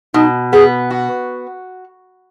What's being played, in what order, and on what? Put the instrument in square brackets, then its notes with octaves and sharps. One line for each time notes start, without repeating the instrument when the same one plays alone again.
[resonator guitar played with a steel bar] B2 [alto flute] D#4
[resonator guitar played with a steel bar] B3 [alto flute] G#4
[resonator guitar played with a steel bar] F#4